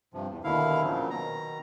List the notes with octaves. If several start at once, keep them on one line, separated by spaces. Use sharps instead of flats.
G2 C3 F3
E2
D#2 B2 D3 D#3 E4 F5
A#2 C#3 F3 F#3
B2 D#3 A#5